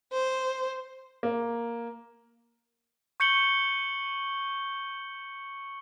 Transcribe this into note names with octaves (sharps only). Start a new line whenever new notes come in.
C5
A#3
C#6 G6 C#7 F#7 G7